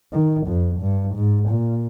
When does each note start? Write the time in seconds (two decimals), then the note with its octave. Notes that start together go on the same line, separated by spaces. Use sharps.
0.13 D#3
0.47 F2
0.81 G2
1.15 G#2
1.49 A#2